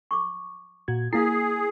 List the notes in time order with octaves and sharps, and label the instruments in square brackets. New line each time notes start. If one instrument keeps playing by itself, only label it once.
[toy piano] C#6 D6
[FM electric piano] A#2 F#4 G#6
[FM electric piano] A#3 C7 [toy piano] E4 F5 [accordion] G#4